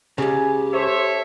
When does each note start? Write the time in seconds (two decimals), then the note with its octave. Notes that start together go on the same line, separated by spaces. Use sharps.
0.18 C#2 C#3 G4 G#5
0.73 A4 C5 C#5 E5